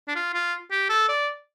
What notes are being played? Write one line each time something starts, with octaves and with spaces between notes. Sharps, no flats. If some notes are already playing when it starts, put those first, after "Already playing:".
D4
F4
F4
G4
A4
D5